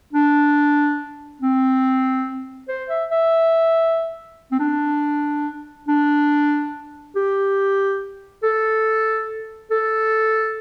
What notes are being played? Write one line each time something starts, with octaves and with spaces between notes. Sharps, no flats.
D4
C4
C5
E5
E5
C4
D4
D4
G4
A4
A4